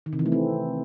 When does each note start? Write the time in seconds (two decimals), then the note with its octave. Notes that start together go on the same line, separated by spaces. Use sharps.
0.06 D#3
0.13 C3
0.19 E3
0.26 A3
0.32 C4